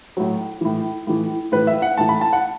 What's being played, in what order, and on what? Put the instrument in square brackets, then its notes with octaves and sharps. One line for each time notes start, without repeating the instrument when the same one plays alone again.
[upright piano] A2 F#3
A2 E3
A2 E3
A2 E3 B4
E5
F#5
A2 E3 A5
B5
A5
F#5